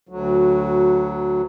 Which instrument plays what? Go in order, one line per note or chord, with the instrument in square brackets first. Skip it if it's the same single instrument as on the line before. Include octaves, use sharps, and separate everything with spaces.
[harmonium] D2 F#3